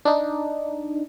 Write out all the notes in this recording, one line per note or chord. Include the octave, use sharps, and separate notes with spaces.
D4 D#4